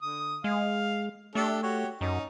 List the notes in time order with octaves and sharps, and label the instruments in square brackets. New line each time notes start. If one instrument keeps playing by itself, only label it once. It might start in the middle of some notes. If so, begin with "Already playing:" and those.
[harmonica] D3 D#6
[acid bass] G#3 [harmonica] F5
[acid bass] A3 [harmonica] D4 G4 A4
[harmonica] F#4 G4 C#5
[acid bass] F#2 [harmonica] C#4 D#4